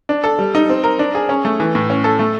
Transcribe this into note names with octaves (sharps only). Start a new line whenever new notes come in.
D4
A4
G3
D#4
C4
A#4
D4
G#4
C#4
A3
E3
A2
C#4
A4
A3